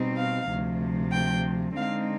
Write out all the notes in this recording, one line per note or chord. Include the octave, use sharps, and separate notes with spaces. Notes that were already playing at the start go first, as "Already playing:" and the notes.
Already playing: B2 G3 C4 D#4
F5
D2 C3 F3
G5
D3 G#3 C4 D#4 F5